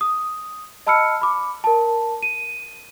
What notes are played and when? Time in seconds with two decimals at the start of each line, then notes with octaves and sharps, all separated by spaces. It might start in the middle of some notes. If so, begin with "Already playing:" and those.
0.01 D#6
0.87 D#5 A5 B5 E6 F6 C#7
1.21 B5 D6
1.64 A#4 A5
2.23 D#7